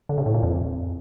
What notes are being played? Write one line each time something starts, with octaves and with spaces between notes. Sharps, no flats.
D3
C#3
A2
A#2
F2